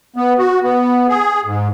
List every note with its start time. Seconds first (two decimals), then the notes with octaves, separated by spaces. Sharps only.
0.16 B3
0.38 F#4
0.63 B3
1.09 G#4
1.44 G#2